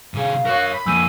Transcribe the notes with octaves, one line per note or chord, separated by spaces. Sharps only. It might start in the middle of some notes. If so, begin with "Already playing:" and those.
C3 G#4 F5
F#4 A#4 C#5
B5
F2 A#3 G#5 E6 G6 D#7